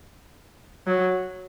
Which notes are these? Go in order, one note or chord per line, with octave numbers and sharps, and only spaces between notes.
F#3